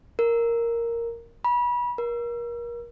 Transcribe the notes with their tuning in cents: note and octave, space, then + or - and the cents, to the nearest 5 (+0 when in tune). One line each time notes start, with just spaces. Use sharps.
A#4 -5
B5 -30
A#4 +30